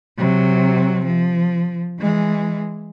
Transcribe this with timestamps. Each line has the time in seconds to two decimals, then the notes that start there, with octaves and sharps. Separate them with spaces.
0.18 C3 F#3
1.05 F3
1.99 E3 G#3